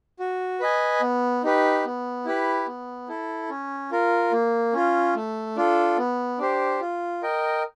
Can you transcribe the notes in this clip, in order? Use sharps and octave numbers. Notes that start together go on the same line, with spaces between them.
F#4
B4 D#5 G#5
B3
D#4 G4 B4
B3
E4 G4 B4
B3
E4 A4
C#4
F4 A#4
A#3
C#4 F4
A3
D4 F4 A4
B3
D4 G4 C5
F4
A#4 D#5 G5